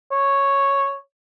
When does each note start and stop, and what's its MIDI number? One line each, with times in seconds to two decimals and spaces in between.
0.11 0.96 73